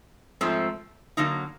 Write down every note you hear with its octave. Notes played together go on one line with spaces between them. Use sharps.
G#2 F3 A3 C4
D3 F#3 A#3 D#4